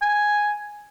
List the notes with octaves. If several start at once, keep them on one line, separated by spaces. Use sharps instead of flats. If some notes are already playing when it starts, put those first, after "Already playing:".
G#5